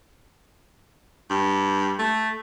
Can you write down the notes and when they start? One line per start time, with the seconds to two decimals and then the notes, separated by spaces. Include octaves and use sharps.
1.30 G2
1.99 A3